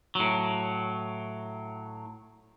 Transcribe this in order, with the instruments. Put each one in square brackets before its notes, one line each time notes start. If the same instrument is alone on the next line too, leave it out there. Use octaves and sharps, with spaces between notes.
[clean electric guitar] A2 F#3